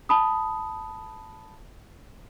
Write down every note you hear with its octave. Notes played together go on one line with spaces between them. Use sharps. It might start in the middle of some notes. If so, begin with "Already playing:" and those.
A5 B5 D#6